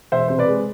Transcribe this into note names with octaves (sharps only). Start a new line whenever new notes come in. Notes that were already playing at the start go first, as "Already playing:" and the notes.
E1 C5 E5
C3 C5
B4 D5
G#3